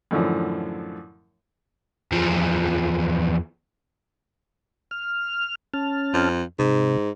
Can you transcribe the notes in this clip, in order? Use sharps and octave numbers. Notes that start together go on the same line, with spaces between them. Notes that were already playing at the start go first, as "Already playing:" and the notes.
F#2 A2 D3 E3 F3
E2 F3
F6
C#4 A5 F6
F2
G#2 C3